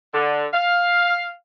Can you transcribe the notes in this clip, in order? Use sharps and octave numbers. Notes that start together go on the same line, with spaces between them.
D3
F5